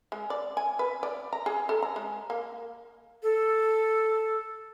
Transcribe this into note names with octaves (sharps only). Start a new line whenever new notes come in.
G#3
D5
G#5
B4
D5
A#5
G#4
A4
A#5
G#3
A#3
A4